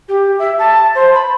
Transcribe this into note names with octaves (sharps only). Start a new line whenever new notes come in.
G4
E5
A5
C5
B5